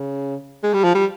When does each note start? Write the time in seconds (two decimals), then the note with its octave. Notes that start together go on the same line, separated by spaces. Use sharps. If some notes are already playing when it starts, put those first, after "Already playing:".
Already playing: C#3
0.63 G#3
0.74 G3
0.84 F3
0.95 G3